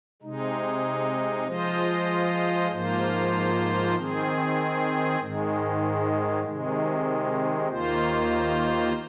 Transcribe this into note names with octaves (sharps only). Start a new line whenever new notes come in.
C3 G#3 D#4
F3 G#3 F4 C5 D#5
G#2 F3 A#3 F4 C5
D#3 C4 G#4
G#2 D#3 G#3
C3 D#3 G#3
D#2 D#3 A#3 F4 C5